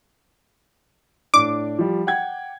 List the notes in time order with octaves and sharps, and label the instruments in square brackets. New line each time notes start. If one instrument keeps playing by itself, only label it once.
[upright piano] A2 D4 [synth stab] D6
[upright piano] F3 G3
F#5 G5 G#6